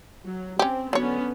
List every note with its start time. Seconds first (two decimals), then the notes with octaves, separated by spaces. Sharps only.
0.23 F#3
0.59 C4 C#4 G4
0.93 D3 F#3 B3 C#4 C#5